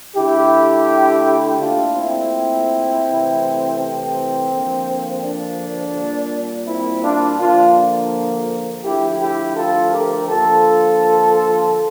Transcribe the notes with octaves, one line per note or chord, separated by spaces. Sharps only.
D3 A3 E4 G4
A#2 A3 D4 F4
C4 E4
C3 E3 A3
C4
D3 F3 A#3
D4
A#2 G3 A#3
C4 E4
D4 F4
D3 F3 A#3 D4 F4
D3 F3 A3 E4 G4
E4 G4
F4 A4
G4 A#4
D3 F3 A#3 F4 A4